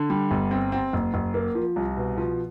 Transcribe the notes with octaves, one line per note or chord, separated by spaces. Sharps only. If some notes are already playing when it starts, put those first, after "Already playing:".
Already playing: D3
G3
G1
C4
C4
F#1
F#1
A#3
F3
C2
B2
F3